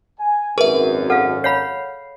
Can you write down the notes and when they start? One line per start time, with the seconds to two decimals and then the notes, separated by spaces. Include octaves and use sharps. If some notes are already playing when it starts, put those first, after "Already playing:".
0.19 G#5
0.58 G#1 F#2 G#4 A#4 B4 E5
1.10 A4 F5 F#5 F6
1.44 C#5 F5 B5 C7